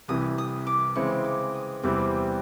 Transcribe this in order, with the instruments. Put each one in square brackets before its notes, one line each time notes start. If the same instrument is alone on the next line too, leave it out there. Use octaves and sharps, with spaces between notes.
[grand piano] C2 C3 E3 [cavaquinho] D#6
[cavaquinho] D#6
D6
[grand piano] C#3 E3 G#3 C4 E4 [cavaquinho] C#6
[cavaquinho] D6
D#6
[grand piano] E2 C3 E3 G3 C4 [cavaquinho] D6